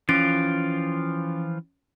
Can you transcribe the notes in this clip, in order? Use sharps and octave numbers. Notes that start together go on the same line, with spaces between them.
E3 F3 C#4 F4 A6 D7